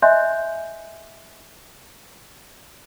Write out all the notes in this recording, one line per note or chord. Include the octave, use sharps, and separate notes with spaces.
D#5 E5 G#5 C6 F#6 G6